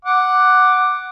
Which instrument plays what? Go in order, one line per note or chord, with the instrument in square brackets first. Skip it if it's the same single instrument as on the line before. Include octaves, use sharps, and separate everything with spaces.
[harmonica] F#5 D6